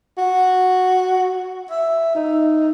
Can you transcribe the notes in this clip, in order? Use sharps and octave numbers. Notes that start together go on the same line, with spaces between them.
F#4
E5
D#4